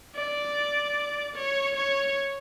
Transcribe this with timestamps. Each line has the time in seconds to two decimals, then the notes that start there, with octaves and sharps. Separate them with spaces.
0.15 D5
1.36 C#5
1.77 C#5